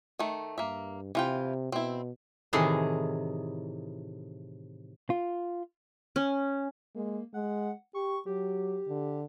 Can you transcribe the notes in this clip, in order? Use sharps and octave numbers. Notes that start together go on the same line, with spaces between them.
D#3 A3
G2 A#3 E5
C3 E3 F4 G5
B2 C4 E4
A2 C3 D#3 E3 G#4 A5
F4
C#4
G#3 A#3
G#3 F#5
G4 C#6
F#3 G4
D3